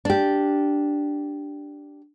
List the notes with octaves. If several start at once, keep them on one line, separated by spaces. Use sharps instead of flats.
D4 G4